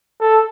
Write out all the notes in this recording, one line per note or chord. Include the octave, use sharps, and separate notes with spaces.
A4